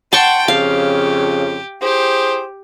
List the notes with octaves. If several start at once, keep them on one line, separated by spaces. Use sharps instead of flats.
F#5 G5 A5 C6 C#6
F2 C#3 G4 F5
E4 G4 G#4 C5